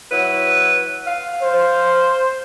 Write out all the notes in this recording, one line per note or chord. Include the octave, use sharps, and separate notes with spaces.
F#3 E4 B4
F5
C5